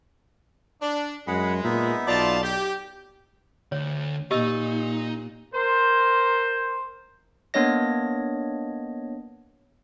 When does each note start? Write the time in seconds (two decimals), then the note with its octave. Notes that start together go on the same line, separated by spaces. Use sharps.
0.82 D4
1.28 F#2 G#3 G#4 F#5 B5
1.64 A#2 B3 D#4 E5
2.08 B1 F4 D5 A5
2.43 G4
3.72 D2 C#5
4.31 A#2 D#4 G4 D#5 E6
5.54 A#4 C5
7.54 A#3 B3 D4 C#5 D#5 A#6